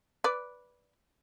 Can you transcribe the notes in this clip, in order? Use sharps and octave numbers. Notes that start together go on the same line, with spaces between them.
B4 D5